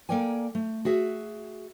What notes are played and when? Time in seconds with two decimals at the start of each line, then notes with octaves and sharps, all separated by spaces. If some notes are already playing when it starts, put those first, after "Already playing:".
0.09 A#3 A4 A#4 D5 G5 G#5
0.55 A3
0.85 F#4 G#4 E5